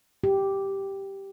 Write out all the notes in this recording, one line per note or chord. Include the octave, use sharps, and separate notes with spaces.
G4